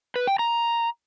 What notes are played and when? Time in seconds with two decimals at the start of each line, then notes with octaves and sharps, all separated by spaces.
0.16 B4
0.27 G5
0.39 A#5